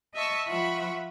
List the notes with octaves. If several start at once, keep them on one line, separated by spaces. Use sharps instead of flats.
D#5 E5 A5 C#6
F3 F4 E5 F#5 B5 C#6